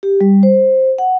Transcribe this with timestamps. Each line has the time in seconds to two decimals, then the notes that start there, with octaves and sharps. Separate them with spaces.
0.03 G4
0.21 G3
0.43 C5
0.98 F#5